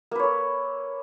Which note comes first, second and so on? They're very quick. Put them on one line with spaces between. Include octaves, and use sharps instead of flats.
A#3 B4 C#5 A4